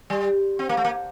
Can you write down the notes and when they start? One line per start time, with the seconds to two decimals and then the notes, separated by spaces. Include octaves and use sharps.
0.10 G3
0.59 C4
0.69 A#3
0.77 A3
0.85 A#3